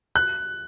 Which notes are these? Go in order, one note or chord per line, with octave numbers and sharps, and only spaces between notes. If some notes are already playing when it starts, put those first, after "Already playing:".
F#6